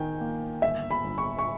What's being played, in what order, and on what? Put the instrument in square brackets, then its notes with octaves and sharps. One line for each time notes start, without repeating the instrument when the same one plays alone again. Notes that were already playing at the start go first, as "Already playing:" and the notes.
Already playing: [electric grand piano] D#3 [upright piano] G5 G#5
[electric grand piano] A#3
[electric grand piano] G1 [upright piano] E5
[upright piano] B5
[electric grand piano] G1
[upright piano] C#6
C#6